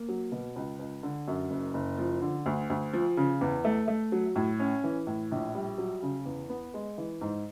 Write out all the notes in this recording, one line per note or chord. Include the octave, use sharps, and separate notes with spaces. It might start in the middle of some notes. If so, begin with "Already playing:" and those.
Already playing: A#3
F#3
B2
C#2
C#2
D3
F#2
F#1
F#1
F3
D3
D2
D2
F3
C#3
E2
A3
A3
F#3
A2
C#4
E3
A2
A#1
G3
F#3
C#3
E2
B3
G#3
E3
G#2